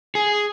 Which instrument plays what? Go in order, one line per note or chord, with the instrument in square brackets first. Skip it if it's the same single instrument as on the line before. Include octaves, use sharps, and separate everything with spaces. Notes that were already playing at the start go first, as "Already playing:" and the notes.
[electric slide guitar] G#4